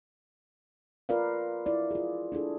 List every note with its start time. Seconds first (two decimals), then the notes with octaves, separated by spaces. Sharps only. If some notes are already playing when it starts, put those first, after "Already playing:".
1.09 F4 A#4 B4 D5 F5
1.66 E4 D5
1.91 F4 G#4
2.32 D4 E4 G#4 A4